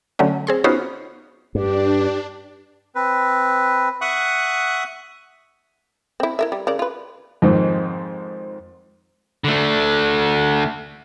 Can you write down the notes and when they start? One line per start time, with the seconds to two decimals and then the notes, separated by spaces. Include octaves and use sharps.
0.19 D3 F#3 A3 C#4
0.47 C4 G#4 C6
0.64 B3 C#4 D#4 F4 F#4 C5
1.55 G2 D4 G4
2.95 C4 B4
4.01 E5 F#5 C#6 D#6 F#6
6.20 C4 E4
6.39 E4 A#4 E5
6.52 G3
6.67 C#3 A#4 D5
6.79 F4 B4
7.42 F2 G#2 D#3 C4
9.44 D3 A3